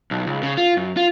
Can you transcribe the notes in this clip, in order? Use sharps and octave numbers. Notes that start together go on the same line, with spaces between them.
B1
C#2
C#3
F4
F#2
F4